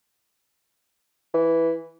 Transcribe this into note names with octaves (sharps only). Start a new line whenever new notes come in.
E3